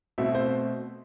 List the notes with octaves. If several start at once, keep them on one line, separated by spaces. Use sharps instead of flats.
B2 A3 C4 E5
C5